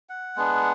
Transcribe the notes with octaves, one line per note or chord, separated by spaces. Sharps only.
F#5
G#3 B3 D4